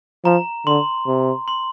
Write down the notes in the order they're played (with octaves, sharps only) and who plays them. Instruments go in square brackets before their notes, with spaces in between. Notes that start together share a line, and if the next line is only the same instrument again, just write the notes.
[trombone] F3 [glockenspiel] A#5
[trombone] D3 [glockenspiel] C6
[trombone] C3
[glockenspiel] C6